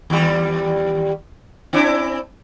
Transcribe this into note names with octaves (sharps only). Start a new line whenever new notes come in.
D#2 G3
C4 D4 E4